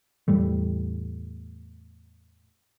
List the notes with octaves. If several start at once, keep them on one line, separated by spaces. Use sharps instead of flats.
E2 A2 G3 A3